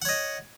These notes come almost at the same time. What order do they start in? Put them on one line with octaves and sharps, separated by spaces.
F#5 C#5 D#5